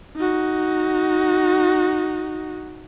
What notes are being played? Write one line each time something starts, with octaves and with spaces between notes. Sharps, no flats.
D#4 F#4